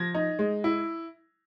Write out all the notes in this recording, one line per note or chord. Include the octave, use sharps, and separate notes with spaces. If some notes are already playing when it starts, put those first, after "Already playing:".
Already playing: F3 G#6 A#6
D#4
G#3
E4